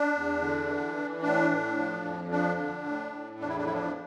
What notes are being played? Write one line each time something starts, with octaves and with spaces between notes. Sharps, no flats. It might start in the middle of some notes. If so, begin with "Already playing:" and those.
Already playing: D4
E2
D3
E3
E3
A2 D4
A2
F3
F2
F3 D4
D3
A2
A2
E2 D4
E4
D4
F3 E4
D4